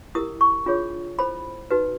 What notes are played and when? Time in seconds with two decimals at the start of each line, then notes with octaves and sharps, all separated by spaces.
0.15 E4 G4 A#4 D#6
0.41 C#6
0.66 D4 F4 G#4 C#5
1.18 E4 A4 C5 B5
1.71 D#4 F#4 B4